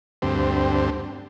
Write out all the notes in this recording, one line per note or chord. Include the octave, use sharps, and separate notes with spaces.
D2 G2 C4